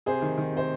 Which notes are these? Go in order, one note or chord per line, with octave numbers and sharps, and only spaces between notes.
C3 G#4 C5
D#3
D#3
C3 C5